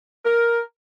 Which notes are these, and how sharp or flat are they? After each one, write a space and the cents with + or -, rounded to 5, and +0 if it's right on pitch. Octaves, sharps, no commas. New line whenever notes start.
A#4 +5